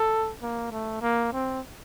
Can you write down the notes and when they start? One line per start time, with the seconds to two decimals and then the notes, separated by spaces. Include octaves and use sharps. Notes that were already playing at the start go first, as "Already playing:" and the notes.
Already playing: A4
0.42 A#3
0.71 A3
1.02 A#3
1.33 C4